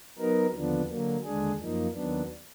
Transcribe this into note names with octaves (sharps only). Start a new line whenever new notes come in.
F#3 B3 D#4 A#4
D#2 D3 F3 B3 D4
D3 F#3 A#3
D#2 D3 G#3 D4 G#4
F#2 F3 A#3 D#4
D#2 D#3 F#3 B3 D4